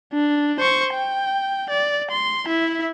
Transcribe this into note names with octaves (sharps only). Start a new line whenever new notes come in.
D4
C5 C#6
G5
D5
C6
E4 E5